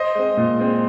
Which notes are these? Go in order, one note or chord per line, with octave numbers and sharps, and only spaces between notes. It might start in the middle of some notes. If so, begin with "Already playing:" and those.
Already playing: C5 D#5
G#3 C4
A#2
G#3 C4